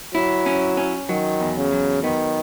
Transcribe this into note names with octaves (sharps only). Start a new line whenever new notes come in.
F#3 E4
C#4
C#4
D#3 F#3
E2
C#3
F#3
D#3 B3